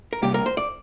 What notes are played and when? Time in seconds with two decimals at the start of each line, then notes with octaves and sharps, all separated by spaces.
0.13 A#4
0.23 C3 G3 A#3 G4
0.34 A#4
0.46 C5
0.57 D5